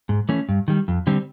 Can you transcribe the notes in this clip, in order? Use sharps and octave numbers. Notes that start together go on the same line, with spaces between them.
G#2
E3 A3 C#4
G2
D#3 G3
F2
D3 G3 C4